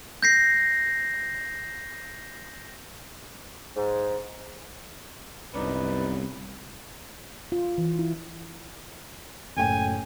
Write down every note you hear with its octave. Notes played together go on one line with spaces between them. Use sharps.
G6 A#6 C7
G#2
C2 F#2 G3 B3 C#4 D#4 B4 D5
F4
E3
E4
F#1 A2 G5 G#5